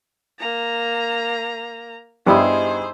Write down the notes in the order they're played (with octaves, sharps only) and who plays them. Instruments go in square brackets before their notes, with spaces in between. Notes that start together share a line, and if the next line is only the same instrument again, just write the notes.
[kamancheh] A#3 A#5
[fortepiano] G2 G3 B3 [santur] D#4 E4 D#5 [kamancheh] G#4 C5